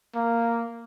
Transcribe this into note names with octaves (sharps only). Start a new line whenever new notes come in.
A#3